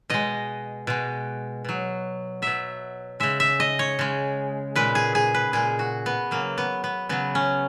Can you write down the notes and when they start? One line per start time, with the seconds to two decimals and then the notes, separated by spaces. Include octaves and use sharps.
0.10 B2 G#3 D#5
0.87 B2 G#3
1.65 B2 F#3
2.42 B2 F#3 E5
3.20 C#3 G#3 E5
3.40 E5
3.60 D#5
3.79 C#5
3.99 C#3 G#3
4.75 A#2 G#3 B4
4.95 G#4
5.15 G#4
5.35 B4
5.53 A#2 G#3 G#4
5.79 F#4
6.06 B3
6.31 C#3 F#3 A#3
6.58 B3
6.84 B3
7.09 C#3 F#3 B3
7.35 C#4